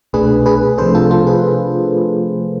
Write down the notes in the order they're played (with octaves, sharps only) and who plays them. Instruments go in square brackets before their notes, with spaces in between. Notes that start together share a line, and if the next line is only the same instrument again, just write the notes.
[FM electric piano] C2 B2 A3 D4 G#4 B4
G#4 B4
C3 F3 A3 D4 A4 C5
F4 A4
F4 A4
G#4 B4